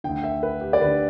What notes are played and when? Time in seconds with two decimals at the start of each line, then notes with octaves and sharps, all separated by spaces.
0.04 D2 D3 G5
0.24 E5
0.43 B4
0.61 G4
0.73 D5
0.81 D2 D3 B4